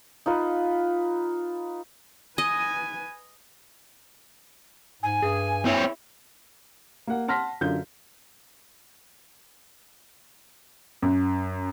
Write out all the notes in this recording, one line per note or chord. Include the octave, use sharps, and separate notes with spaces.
D#4 F4 B4
B4 D#5 G#5
G#2 G#5
G2 G#4
C4 E4 C#5
A#3 F#5
F#5 A5 C6 F6 A#6 B6
F#2 D3 F4 G6
F#2